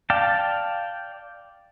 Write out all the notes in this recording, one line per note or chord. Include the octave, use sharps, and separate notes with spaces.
D5 F5 G5 A5